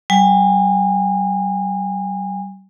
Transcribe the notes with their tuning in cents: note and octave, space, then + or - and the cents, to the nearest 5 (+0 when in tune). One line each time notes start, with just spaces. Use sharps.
G3 -45 G#5 -30